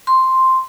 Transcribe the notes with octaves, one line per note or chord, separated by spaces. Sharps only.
C6